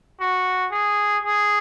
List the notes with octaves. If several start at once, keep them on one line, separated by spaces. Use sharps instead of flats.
F#4
G#4
G#4